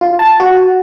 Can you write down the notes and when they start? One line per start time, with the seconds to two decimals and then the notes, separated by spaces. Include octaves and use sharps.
0.01 F4
0.19 A5
0.40 F#4